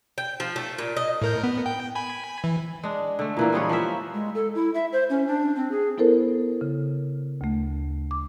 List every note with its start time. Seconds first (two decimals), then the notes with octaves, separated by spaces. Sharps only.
0.18 G5
0.40 F3
0.56 A3
0.78 A#2
0.97 D#5
1.22 A2 A#4 G6
1.43 B3
1.66 G5
1.95 G#5 B5
2.44 E3
2.83 G#3 D4
3.19 D3 A3
3.37 A#2 E3 A#3
3.53 G3 G#3 B3 C#5
3.69 F3 A#3 A#4 E5
4.14 G#3
4.35 A4
4.55 E4
4.74 E5
4.93 C5
5.10 C#4
5.27 D4
5.56 C4
5.71 G#4
5.98 B3 E4 A4 A#4 C5
6.61 C#3
7.41 D2 A3
8.11 D6